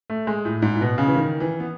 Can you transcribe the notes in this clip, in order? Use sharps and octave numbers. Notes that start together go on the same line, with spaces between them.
A3
G#3
A2
G#2
A2
B2
C#3
E3
D#3
E3
B3